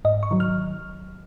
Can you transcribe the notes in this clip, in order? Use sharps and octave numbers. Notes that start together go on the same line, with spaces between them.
G#2 D#5
C#6
D#3 F#3
F6